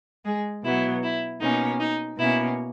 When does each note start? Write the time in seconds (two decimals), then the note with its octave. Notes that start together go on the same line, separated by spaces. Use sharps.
0.25 G#3 G#4
0.64 B2 F#3 B3 E4
1.03 E4
1.40 B2 A#3 C#4 D#4
1.80 D#4
2.18 B2 A#3 C#4 E4